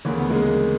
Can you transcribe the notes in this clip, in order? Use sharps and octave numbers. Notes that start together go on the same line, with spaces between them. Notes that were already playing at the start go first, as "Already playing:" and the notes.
D2 C#3 E3 A#3
B3
G#3 A#3